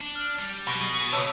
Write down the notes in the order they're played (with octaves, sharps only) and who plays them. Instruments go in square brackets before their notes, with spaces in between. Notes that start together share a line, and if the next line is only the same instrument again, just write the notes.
[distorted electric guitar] D4
[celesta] F6
[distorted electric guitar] G3 [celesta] G6
[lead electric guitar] B2 [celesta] B5 A#6
[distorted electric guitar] G#4
[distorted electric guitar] C#3 [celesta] C#5 A5 E6